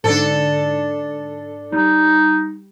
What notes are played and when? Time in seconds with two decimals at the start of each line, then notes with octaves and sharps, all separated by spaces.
0.04 G#2 D3 D4 A4
1.72 G3 D#4